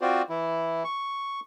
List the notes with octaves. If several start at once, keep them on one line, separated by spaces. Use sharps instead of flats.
C4 F4 F#4 C5 D5
E3 E4
C#6